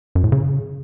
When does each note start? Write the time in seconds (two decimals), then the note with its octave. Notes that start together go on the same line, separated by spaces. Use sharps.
0.15 F#2
0.24 A2
0.32 C#3